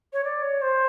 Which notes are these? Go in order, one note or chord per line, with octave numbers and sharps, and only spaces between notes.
C#5
D5
C#5
C5